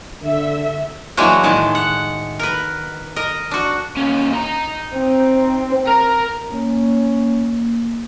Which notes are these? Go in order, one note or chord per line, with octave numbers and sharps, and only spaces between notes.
D3 A4 E5
E3 F#3 G#3 A#3 D4 F#4
A2 D#3 G#3 A5
F#5
A#4 B4
A#4 D#5
D4 F#4
D#2 C#4
D#4 A#5
C4
A#4 A#5
A#3 C#4